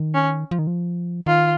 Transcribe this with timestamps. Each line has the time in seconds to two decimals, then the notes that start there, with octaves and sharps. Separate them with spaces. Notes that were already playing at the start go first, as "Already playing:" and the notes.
Already playing: D#3
0.14 C#4
0.51 F3
0.59 D#3
0.67 F3
1.26 D#3 F4